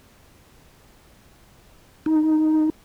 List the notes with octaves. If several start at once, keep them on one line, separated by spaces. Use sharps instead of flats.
D#4